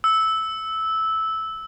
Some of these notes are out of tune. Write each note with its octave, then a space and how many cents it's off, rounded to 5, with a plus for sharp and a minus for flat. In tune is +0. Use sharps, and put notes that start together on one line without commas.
E6 -10